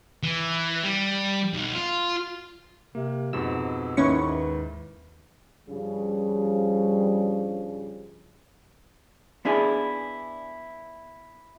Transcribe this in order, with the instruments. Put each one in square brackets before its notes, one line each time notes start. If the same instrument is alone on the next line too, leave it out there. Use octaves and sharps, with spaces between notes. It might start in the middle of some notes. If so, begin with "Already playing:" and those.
[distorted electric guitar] E3
G3
B1
F4
[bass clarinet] C3 [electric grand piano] A#3
[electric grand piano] F2 G#2 B2 [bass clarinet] G#3 [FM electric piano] E6
[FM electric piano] D#2 E4 B4 [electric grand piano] G#2 D#3 [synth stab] C#4 C#6
[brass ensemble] G2 C#3 F3 G3
[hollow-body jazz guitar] B3 D4 E4 G#4